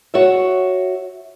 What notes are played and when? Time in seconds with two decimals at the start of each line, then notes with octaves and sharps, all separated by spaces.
0.14 F#4 C#5 E5